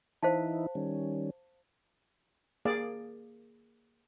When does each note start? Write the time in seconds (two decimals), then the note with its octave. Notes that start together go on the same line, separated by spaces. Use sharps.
0.23 E3 D#4 E4 C5 F5 A5
0.75 D#3 G3 C#4
2.65 A#3 G#4 D5 F5